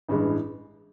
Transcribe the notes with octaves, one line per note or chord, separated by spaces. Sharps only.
A1 G2 E3 G#3